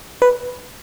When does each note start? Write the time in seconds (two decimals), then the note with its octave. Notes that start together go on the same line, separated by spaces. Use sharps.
0.22 B4